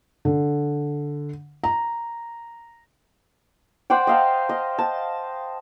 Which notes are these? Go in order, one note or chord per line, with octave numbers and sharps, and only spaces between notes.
D3
A#5
C5 D5 F#5 G5
D#5 F5 A5
D#5
A5